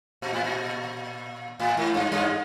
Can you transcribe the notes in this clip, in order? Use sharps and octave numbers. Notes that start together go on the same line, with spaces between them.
A#2
A2
A#2
A2
G#2
G2
G2